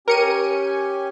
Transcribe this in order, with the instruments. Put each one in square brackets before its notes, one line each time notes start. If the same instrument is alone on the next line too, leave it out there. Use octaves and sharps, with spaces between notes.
[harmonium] C#4 G4 G#5 [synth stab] A#4 C#7 D#7